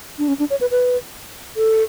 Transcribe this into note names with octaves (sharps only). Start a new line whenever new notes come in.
D4
C#4
D4
C#5
B4
B4
A4